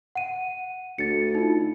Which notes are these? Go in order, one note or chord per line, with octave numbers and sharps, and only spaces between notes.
F#5 D#7
D2 A6 C#7
D#4 F4